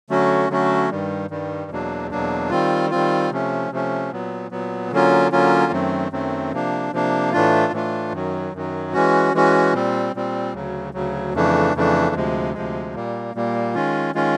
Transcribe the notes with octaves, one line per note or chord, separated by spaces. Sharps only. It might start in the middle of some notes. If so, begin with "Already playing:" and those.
D3 F#3 A3 C#4 F#4
D3 F#3 A3 C#4 F#4
G2 D#3 G3
G2 D#3 G3
E2 B2 F#3 A#3 D4
E2 B2 F#3 A#3 D4
D#3 G3 C4 F4
D#3 G3 C4 F4
C3 F3 A3 C#4
C3 F3 A3 C#4
A#2 F#3 B3
A#2 F#3 B3
D3 F#3 A#3 C#4 F4
D3 F#3 A#3 C#4 F4
F#2 D#3 F#3 A3 C4
F#2 D#3 F#3 A3 C4
C3 F3 A#3 D4
C3 F3 A#3 D4
A2 E3 A3 D4 F4
A2 E3 A3 D4 F4
F#2 D#3 F#3
F#2 D#3 F#3
E3 G#3 C#4 F#4
E3 G#3 C#4 F#4
A#2 G3 C4
A#2 G3 C4
D2 C#3 F#3
D2 C#3 F#3
F2 C#3 E3 A3 D4
F2 C#3 E3 A3 D4
D2 C3 F3 G#3
D2 C3 F3 G#3
A#2 G3 A#3
A#2 G3 A#3
D#3 G#3 C#4 F4
D#3 G#3 C#4 F4